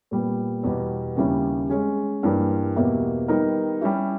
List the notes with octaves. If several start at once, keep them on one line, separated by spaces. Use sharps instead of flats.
A#2 G3 B3
E2 B2 G3
D#2 C#3 G3 C#4 E4
G#3 C#4 G#4
G2 E3 G3 A#3
E2 B2 A#3 E4 G4
D#3 G3 B3 D#4 A#4
G3 C#4 E4 G4